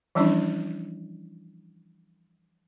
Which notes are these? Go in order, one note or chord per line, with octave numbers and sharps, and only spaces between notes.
E3 F3 G3 C#4 D4 E4